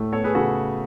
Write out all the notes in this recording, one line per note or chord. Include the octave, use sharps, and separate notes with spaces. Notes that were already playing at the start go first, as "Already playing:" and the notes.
Already playing: A2 A3
B3 A4 C#5
G#4 B4
C#3 F#4 A4